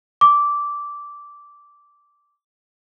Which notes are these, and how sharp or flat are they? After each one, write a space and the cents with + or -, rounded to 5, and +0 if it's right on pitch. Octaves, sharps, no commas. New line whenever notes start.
D6 -10